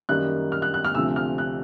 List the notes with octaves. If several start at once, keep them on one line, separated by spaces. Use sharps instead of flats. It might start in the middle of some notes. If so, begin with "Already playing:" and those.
F#2 D#3 G3 A#3 F#6
F6
F#6
F#6
F6
D2 C3 F3 E6
F6
F#6